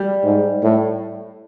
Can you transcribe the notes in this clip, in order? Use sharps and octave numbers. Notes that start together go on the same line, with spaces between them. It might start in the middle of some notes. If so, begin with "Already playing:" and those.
Already playing: G3
G#2
A2